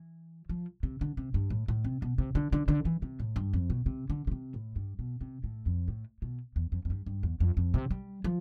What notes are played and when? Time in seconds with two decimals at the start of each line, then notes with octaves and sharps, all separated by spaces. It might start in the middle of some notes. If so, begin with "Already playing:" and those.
Already playing: E3
0.49 F3
0.83 C3
1.01 D3
1.17 C3
1.34 G2
1.50 A2
1.68 A2
1.84 C3
2.02 B2
2.18 C3
2.35 D3
2.53 D3
2.68 D3
2.85 E3
3.02 C3
3.20 A2
3.36 G2
3.53 F2
3.70 B2
3.86 C3
4.10 D3
4.27 D3
4.32 C3
4.54 A2
4.76 G2
4.99 B2
5.21 C3
5.44 A2
5.66 F2
5.88 A2
6.22 B2
6.56 E2
6.72 F2
6.85 F2
6.90 G2
7.06 G2
7.23 E2
7.40 F2
7.57 F2
7.74 C3
7.91 G3
8.24 F3